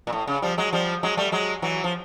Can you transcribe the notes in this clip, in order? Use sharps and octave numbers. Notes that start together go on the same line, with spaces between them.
A#2
A2
C#3
F3 G3
F#3 G#3
F3 G3
F#3 G#3
G3 A3
F#3 G#3
E3 F#3
F3